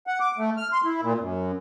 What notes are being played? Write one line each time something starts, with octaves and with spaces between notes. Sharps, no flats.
F#5
D6
A3
F6
C6
E4
A#2
F#2